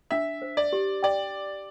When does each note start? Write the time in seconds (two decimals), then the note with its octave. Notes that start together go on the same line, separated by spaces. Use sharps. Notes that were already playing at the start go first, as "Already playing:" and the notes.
0.11 D4 E5
0.42 C5
0.57 D5
0.73 G4
1.03 D5 G5